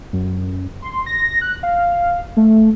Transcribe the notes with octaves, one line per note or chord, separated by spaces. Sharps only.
F#2
C6
A#6
F#6
F5
A3